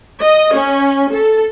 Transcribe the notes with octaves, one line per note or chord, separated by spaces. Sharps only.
D#5
C#4
A4